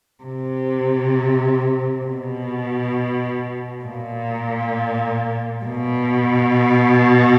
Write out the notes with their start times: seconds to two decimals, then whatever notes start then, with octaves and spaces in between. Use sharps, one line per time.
0.24 C3
2.04 B2
3.85 A#2
5.65 B2